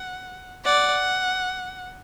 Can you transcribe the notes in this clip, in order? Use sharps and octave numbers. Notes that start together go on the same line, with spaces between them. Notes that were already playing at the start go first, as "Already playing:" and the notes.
Already playing: F#5
D5 F#5